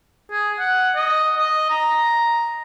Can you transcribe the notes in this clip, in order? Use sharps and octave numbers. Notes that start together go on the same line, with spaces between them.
G#4
F#5
D#5
D#5
A#5